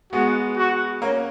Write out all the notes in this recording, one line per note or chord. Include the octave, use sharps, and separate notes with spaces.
G#3 B3 F#4
F#4
A#3 C#4